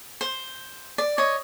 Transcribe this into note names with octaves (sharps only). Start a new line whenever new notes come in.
C5
D5
C#5 D#5